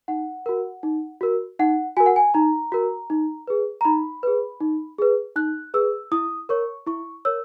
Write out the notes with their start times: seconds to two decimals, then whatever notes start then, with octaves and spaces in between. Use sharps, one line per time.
0.08 D#4 F#5
0.46 F#4 A#4
0.83 D#4
1.21 F#4 A#4
1.59 D#4 F#5
1.97 F#4 A#4 G#5
2.06 F#5
2.16 G#5
2.34 D#4 A#5
2.72 F#4 A#4
3.10 D#4
3.47 G#4 B4
3.81 A#5
3.85 D#4 B5
4.23 G#4 B4
4.61 D#4
4.98 G#4 B4
5.36 D#4 F#6
5.74 G#4 B4 E6
6.12 E4 D#6
6.49 A#4 C#5 C#6
6.87 E4 C#6
7.25 A#4 C#5 E6